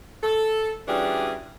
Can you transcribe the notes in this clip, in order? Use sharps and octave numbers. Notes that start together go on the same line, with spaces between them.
A4
E3 G3 C#4 D4 F#4 G#4